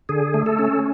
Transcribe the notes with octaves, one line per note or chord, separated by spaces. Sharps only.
D3 G#4
A3
A4
C#4